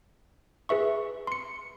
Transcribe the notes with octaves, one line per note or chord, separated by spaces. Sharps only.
G#4 B4 E5 C#6
C6 C#7